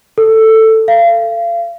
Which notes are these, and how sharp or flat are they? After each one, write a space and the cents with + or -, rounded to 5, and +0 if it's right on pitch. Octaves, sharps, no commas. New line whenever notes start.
A4 +10
F5 -35